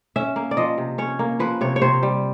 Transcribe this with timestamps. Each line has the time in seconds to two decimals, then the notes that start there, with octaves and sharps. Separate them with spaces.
0.16 C#4 E5
0.36 A#3
0.51 D5
0.57 F3 D#5
0.78 C3
0.98 C#4 C#5
1.19 A#3
1.40 F3 B4
1.61 C3 C#5
1.76 C#5
1.82 C3 C5
2.03 G3